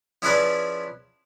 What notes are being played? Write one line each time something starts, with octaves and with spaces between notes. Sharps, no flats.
F3 C#4 E4 G#4 B4 D5